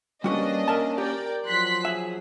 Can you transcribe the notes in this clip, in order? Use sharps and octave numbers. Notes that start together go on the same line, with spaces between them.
G3 A#3 C#4 D4 F#4 B4 D#5
A#4 E5 A5
G4 A#4 D5 G5
F3 F#3 C6 F#6 B6
G#4 E5